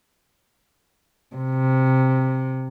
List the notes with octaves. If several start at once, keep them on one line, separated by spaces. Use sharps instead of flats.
C3